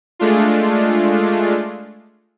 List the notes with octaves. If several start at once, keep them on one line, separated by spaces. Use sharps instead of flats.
G#3 A3 D4 F4